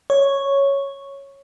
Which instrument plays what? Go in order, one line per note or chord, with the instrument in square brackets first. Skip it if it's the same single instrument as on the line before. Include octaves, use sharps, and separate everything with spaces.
[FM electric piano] C#5